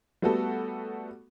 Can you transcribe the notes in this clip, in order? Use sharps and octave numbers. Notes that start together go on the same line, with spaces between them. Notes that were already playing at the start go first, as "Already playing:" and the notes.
G3 A3 B3 F#4 A4